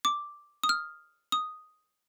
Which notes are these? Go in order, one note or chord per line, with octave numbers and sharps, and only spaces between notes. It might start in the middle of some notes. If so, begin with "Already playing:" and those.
D6
D#6
F6
D#6